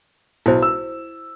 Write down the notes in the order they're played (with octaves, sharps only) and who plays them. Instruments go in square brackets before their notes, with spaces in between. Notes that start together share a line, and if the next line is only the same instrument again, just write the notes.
[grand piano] B1 [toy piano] E4 C5
[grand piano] E6